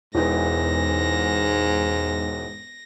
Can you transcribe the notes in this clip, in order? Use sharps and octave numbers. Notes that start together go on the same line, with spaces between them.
E1 E2 G#2 E3 D#4 A#6